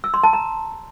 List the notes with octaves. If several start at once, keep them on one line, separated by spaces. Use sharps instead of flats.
E6
C6
A5
A#5